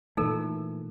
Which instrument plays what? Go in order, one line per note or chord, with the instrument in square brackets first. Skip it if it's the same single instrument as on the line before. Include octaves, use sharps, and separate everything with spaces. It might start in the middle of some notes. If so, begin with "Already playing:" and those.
[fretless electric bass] A#2 E3 A3 [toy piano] D#4 A4 A#4